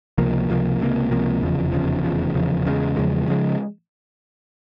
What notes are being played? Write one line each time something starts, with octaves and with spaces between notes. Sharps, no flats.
C#2 C3 F3 A#3
C#2 C3 F3 A#3
C#2 C3 F3 A#3
C#2 C3 F3 A#3
F1 E2 C#3 F3
F1 E2 C#3 F3
F1 E2 C#3 F3
F1 E2 C#3 F3
E2 C#3 F3 G#3
E2 C#3 F3 G#3
C#3 F3 G#3